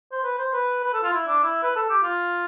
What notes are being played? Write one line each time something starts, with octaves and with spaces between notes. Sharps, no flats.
C5
B4
C5
B4
B4
A4
F4
E4
D4
E4
B4
A4
G4
F4